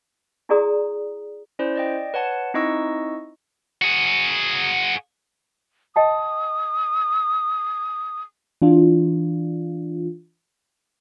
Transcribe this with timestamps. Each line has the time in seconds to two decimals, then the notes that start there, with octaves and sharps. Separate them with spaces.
0.49 E4 F#4 G#4 D5 A#5 D#6
1.59 C#4 E4 C5 D5
1.76 D5 D#5 G5
2.14 B4 C#5 F#5 A5
2.54 C4 D#4 E4 D#5 C#6 E6
3.82 F#4 G#4
5.96 D#5 G5 A5 D#6
8.62 E3 D4 F4